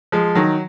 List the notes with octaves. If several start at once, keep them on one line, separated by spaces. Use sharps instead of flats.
F3 G#3
D#3 F#3